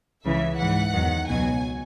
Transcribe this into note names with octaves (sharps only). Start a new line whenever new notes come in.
C#2 C#3 E3 E5
G#2 E3 F#5
E2 D#3 F#3
C#2 B2 F#3 G#5